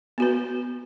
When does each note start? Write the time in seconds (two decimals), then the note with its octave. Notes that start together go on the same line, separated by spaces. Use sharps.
0.18 B3 F#4 B4